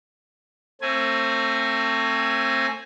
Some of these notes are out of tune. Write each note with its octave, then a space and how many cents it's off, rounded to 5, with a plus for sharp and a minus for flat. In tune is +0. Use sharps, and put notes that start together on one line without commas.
A3 +30 C4 +25 G#5 +0